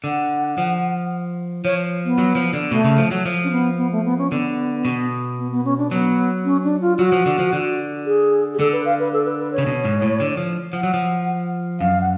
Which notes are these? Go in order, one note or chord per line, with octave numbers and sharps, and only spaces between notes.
D3 F#5
F3
F3 C#5
B3
F#3
F3
D3
B2 A3
C#3
F3
F#3
F3
C#4
B3
B3
A3
B3
C#4
D3 B3
B2
B3
B3
C#4
D4
F#3 B3
C#4
D4
F4
F#3 F#4
F3
D3
F3
D3
G#4
G#4
D3 A4
B4
F5
B4
A4
B4
B4
C#5
C#3
B2
G#2
A2
D3
F3
F3 F#5
F#3
F3
F#2 F5
F#5